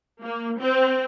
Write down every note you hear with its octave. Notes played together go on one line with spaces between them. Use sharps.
A#3
C4